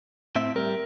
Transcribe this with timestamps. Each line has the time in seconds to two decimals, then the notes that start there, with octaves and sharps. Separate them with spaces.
0.36 A2 C4 E5
0.56 G3 A#4